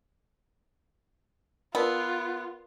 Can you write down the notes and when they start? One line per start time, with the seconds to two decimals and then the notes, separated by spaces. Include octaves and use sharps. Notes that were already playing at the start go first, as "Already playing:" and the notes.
1.75 B3 F4 A#4 D5 A5